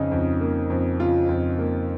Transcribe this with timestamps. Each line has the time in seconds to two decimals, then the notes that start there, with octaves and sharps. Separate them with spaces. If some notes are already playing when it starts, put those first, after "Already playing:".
Already playing: F2 C#3 D#4
0.11 F2
0.41 A#3
0.70 F2
0.99 C#3 F4
1.29 F2
1.59 A#3